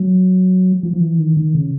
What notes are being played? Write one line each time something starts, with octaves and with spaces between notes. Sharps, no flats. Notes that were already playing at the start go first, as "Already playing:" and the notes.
Already playing: F#3
F3
F3
E3
D#3
D#3
C#3